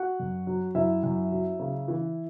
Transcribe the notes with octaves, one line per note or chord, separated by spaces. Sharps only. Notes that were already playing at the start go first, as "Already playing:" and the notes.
Already playing: F#4 F#5
F#2
F#3
F#2 E4 E5
F#2
F#3
C#3
E3